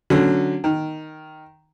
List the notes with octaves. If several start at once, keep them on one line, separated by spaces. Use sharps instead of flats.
D3 F#3 C#4
D#3